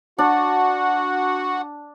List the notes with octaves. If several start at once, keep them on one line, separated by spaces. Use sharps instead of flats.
D4 F#4 F#5